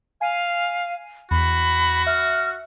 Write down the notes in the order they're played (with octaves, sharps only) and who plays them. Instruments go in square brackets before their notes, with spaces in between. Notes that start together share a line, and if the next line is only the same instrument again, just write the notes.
[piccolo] F5 [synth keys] G#5 C7 D#7
[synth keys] E2 [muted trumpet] F#4 [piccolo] B5
[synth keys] E5 [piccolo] F6